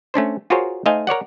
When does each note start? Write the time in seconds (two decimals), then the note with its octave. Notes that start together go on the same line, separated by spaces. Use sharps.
0.14 A3 C#4 D4 C5
0.50 F4 F#4 G#4 A#4 C5 C#5
0.86 A3 D#4 C5 D#5 F5 G#5
1.07 A#4 C#5 D5 F#5